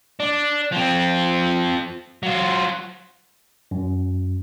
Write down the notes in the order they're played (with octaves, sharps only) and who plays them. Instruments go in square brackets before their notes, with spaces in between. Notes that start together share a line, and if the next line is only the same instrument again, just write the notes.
[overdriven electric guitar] D4
F3 C4
F#3 F4
[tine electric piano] F#2